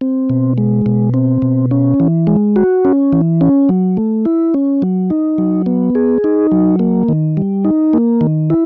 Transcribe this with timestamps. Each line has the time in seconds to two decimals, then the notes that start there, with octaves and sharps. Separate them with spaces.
0.01 C4
0.30 B2
0.58 G#3
0.86 B2
1.14 C4
1.42 B2
1.71 C#4
2.00 E3
2.27 G#3
2.56 F#4
2.85 C#4
3.13 E3
3.41 C#4
3.69 F#3
3.97 A3
4.25 E4
4.54 C#4
4.82 F#3
5.10 D#4
5.38 F#3
5.66 B3
5.95 G#4
6.24 D#4
6.52 F#3
6.79 A#3
7.08 D#3
7.37 G3
7.65 D#4
7.93 A#3
8.21 D#3
8.50 E4